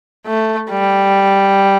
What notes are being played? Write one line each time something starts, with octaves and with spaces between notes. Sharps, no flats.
A3
G3